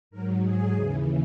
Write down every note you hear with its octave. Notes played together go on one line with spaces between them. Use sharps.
G#2 F#3 A#4
G#4
D#2 C#3 E3 G#4